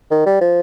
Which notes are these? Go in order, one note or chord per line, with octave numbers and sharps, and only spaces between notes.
D#3
G3
F3